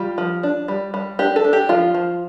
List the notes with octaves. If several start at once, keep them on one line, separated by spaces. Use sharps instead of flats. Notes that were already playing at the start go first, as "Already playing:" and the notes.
Already playing: G3 F4
F3
D4
G3
G3
D4 G4
A4
D4
G4
F3 F4
F3